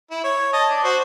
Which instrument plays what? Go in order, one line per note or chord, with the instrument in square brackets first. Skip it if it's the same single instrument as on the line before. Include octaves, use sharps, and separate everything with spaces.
[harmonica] E4
C#5
D#5 A5
D4
F#4 C5